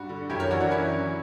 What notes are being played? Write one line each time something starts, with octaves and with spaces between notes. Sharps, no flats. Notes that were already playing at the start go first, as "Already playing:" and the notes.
Already playing: G2 F#4
D3
F#2 E4 G4
A#4 C#5
E3 D4 F#4
D4 F#4
F#2 C#4 E4
E3